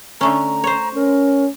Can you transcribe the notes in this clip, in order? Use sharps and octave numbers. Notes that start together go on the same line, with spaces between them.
D3 A3 C#4 A#5
C5 C#5
C#4 A#4